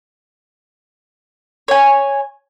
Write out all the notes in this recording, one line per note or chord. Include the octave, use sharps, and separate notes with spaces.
C#5 G#5